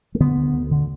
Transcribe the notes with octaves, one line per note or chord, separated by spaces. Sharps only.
A3
D3 B3
D2
D2
D3